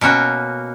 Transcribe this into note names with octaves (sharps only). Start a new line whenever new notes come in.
B2 A#3 C#4 F#4